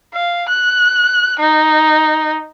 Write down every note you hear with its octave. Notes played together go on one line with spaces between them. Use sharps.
F5
F#6
D#4